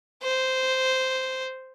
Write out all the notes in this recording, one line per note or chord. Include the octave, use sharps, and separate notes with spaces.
C5